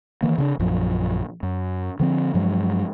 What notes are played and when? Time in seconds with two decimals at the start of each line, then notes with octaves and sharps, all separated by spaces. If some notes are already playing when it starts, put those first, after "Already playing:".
0.22 D#3 E3 A#3
0.38 C#3 C#4 D4
0.59 A#1 F#2 F3
1.43 F#2
2.00 D3 F3 C4
2.34 G2 F3 F#3 G#3